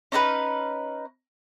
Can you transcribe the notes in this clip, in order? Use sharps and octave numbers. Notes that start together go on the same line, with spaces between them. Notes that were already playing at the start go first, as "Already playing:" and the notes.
C#4 D#4 A4 B4